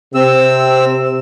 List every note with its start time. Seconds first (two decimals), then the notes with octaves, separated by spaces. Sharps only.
0.15 C3 C4 E6